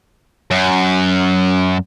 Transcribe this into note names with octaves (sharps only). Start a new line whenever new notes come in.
F#2